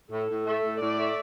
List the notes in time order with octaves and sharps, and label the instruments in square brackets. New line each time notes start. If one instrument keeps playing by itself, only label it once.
[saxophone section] A2 [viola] A4
[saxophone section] A2
A3
A2
[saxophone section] A2 [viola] D5
[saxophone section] A3